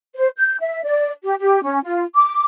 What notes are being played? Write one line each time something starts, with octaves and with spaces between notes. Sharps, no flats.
C5
G6
E5
D5
G4
G4
C#4
F4
D6